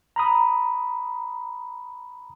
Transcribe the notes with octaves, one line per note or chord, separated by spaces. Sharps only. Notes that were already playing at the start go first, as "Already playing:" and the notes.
A#5 B5 D#6